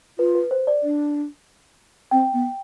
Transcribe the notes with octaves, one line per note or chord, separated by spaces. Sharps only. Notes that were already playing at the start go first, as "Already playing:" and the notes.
F4 B4
B4
C5
D5
D4
C4 G5
B3